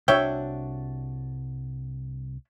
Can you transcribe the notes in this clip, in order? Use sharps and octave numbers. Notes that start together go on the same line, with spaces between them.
C2 D4 F#4 C#5 E5 G5